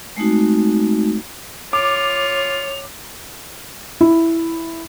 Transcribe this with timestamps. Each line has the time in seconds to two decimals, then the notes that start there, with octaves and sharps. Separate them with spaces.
0.17 G#3 A3 C4 D#4 F#4
1.73 F4 C#5 D6 F7
4.01 E4